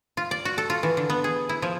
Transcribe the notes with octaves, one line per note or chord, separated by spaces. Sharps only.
F4
D5
F#4
A4
F4
E3
D3
B3
G#4
E4
F3